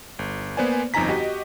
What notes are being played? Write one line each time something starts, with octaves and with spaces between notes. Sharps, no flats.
G1
A#3 B3 B4 C5 D5 G#5
G1 F2 D#4 G#5 A#5 B6
F#4 G4 D#5